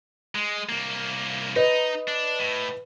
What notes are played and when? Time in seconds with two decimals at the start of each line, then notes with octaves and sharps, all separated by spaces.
0.35 G#3
0.69 C2 A#3
1.56 D#4 B4 D#5
2.08 D4
2.40 A2